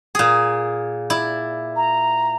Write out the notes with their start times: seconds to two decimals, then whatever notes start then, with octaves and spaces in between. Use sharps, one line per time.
0.15 A#2 G#4
1.10 E4 D5
1.76 A#5